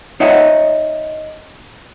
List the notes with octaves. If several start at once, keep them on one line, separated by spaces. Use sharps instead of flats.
D#4 C#5 D#5 E5 F#5